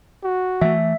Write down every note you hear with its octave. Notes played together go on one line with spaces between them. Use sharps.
F#4
E3 A3 E5